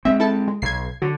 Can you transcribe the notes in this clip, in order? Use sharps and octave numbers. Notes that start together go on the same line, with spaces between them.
G#3 C4 E5
E4 A4 A5
G#3
B1 G#6 C7
D3 F#3